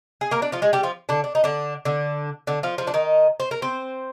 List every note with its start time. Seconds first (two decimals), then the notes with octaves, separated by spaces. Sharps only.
0.21 G#4
0.31 A#3 A#4
0.42 D4 D5
0.52 F3 F4
0.62 G#3 G#4
0.73 G3 G4
0.83 F3 F4
1.09 D3 D4
1.24 D4
1.35 D#4
1.44 D3 D4
1.85 D3 D4
2.47 D3 D4
2.63 F3 F4
2.78 F3 F4
2.87 D4
2.94 D#3 D#4
3.40 C5
3.51 A#4
3.62 C4 C5